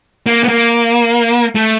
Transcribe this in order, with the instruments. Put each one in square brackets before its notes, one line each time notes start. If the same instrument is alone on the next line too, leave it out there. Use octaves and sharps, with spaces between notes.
[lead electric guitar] A#3
B3
A#3
A3